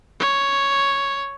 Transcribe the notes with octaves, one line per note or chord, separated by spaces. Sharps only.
C#5